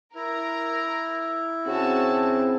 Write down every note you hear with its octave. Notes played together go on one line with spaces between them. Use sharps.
E4 A#4 A#5
C#3 C4 F#4 A5